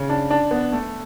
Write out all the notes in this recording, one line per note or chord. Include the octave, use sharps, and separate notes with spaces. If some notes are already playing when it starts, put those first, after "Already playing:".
Already playing: C#3
D4
D4
B3
A3